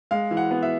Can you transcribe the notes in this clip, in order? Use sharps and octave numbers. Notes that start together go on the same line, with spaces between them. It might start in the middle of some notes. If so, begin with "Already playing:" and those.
G#3 F5
E3
F#5
B3
E5